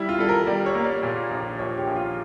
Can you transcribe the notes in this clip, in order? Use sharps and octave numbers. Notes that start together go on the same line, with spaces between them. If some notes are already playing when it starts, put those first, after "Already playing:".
Already playing: G3 E4
F4
G3 A4
A#4
G3 D5
C#5
A#3
D5
A#2
A#1
A#1 C#5
G4
A#1
F4